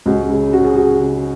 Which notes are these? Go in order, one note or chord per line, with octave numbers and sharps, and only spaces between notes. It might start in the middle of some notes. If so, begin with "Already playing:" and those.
C#2 F#4
C#3
C#3 F#4
G#4
C#3 F#4
C#3